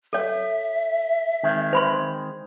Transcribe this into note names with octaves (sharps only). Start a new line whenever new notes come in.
A4 C#5 E5
D#3 G#3 C4
C5 B5 C6